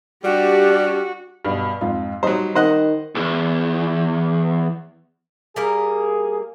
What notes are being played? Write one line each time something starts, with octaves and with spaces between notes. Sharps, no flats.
G3 D4 F#4 G4
G2 B2
F2 G#2 F4
F#3 G3 D#4 C5
D#3 C5 D#5 F#5
B1 E2
G3 A#3 G#4 A#4